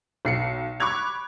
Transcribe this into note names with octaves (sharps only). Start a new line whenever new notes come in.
B1 C7 C#7
B5 C#6 D6 F#6 G#6 F7